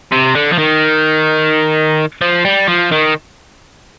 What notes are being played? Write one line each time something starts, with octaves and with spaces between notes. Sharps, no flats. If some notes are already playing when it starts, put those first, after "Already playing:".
C3
D3
F3
D#3
F3
G3
F3
D#3